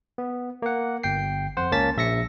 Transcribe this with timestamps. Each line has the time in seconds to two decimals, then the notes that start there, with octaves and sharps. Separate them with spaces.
0.18 B3
0.62 A#3 F#5
1.03 G1 G5 C7
1.57 F2 C5 F#5
1.72 C#2 A#3 C#4 A5 A6 B6
1.97 A#1 E5 A#6 C#7